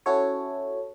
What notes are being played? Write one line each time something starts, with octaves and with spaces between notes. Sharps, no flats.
C#4 E4 F#4 A4 C#5